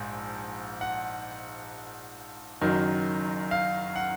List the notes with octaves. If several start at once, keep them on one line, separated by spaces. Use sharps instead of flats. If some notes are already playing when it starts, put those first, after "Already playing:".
Already playing: A#1 G#2 G#5
F#5
F#1 F#2 D#3 F#3
F5
F#5